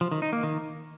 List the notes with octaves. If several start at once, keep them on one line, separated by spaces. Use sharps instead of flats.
F3
D#3
D#4
A#3
D#3